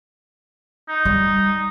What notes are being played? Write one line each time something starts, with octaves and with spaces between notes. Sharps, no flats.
D#4
G3